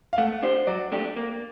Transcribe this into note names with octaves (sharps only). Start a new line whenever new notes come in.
F5
A3 F#5
D4 G4 C5
F#3 D5
A3 D4 G4
A#3